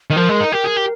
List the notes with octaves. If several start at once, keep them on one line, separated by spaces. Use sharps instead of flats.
D#3
F3 A#4
G#3
D#4
G4 A#4
G#4
G4